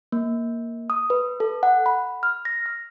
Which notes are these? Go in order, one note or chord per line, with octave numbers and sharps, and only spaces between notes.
A#3
D#6
B4
A4
F#5
B5
F6
A#6
F6